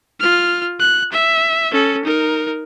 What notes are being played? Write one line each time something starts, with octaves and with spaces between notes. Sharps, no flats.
F4 F6
F#6
E5
C#4 A4
D#4 A#4